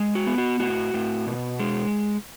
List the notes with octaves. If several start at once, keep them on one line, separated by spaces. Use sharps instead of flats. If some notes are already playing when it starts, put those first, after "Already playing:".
Already playing: G#3
F#4
B3
F#4
A2 F#4
A2
B2
G#3